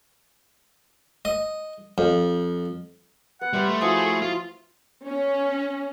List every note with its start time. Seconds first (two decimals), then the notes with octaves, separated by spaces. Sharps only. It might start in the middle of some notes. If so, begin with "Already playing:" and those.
1.25 D#5
1.98 F2
3.41 B3 F#5
3.53 G3 B4 E5 C6
3.68 A3
3.81 F3 E4 F#4 G#4
4.22 F4
5.05 C#4